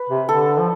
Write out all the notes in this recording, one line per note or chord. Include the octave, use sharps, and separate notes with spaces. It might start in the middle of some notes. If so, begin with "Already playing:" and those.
Already playing: B4
C3
D3 A4
F3